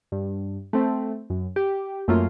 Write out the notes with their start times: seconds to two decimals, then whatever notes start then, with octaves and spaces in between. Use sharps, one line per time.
0.12 G2
0.73 A3 C4
1.30 F#2
1.56 G4
2.08 F#2 A3 A#3 C#4 F4